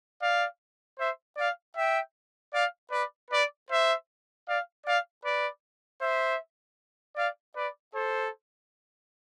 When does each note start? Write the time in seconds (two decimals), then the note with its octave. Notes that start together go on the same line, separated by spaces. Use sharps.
0.21 D5 F5
0.98 C5 E5
1.37 D5 F5
1.76 E5 G5
2.53 D5 F5
2.91 B4 D5
3.30 B4 D5
3.69 C5 E5
4.47 D5 F5
4.85 D5 F5
5.23 B4 D5
6.00 C5 E5
7.16 D5 F5
7.55 B4 D5
7.94 A4 C5